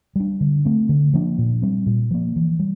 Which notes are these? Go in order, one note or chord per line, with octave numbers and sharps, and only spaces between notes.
G3 D4
D3
A3 C4
D3
F3 A#3 D4
A#2
G3 C4
A#2
F3 A#3
E3
G3